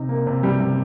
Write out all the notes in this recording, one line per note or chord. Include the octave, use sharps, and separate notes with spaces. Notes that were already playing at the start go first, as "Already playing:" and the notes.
Already playing: C3 D#4
A#3
C3
G3
C3